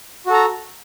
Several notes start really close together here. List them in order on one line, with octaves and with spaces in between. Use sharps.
F#4 A4 A#5